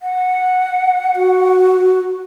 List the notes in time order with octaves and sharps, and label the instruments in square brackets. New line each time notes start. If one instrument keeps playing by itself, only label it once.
[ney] F#5
[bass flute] F#4